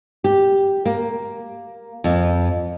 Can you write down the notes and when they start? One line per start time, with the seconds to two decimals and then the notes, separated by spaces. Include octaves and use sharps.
0.24 G4
0.85 A#3
2.04 F2